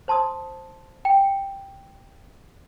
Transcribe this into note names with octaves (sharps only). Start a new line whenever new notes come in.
C5 A5 C6 D#6
G5